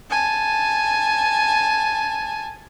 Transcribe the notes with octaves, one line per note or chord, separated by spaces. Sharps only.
G#5 A5